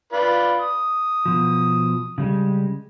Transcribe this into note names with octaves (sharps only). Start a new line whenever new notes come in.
F4 B4 D5
D#6
B2 F3
C#3 G3 G#3